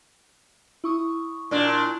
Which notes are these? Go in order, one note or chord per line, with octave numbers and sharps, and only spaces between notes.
E4 C#6 D#6
A#2 D4